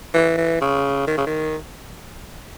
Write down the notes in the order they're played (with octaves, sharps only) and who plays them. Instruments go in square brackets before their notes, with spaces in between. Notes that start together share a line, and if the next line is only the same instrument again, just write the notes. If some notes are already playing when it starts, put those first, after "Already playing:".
[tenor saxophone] E3
E3
C#3
D#3
C#3
D#3